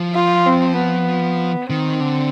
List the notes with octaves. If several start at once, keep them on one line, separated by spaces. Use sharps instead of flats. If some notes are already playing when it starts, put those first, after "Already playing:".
Already playing: F3
F4
C4
B3
D#3 C4
D3